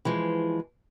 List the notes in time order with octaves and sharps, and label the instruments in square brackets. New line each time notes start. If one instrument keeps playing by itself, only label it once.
[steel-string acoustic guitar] E3 F3 G#3